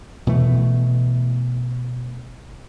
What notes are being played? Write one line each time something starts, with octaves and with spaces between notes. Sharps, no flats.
B2 E3 A3